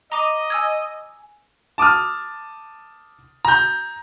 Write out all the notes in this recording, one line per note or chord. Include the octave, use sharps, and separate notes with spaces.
D#5 A#5 D6
G#5 E6 G#6
A5 D6 D#6 F6
A#5 G6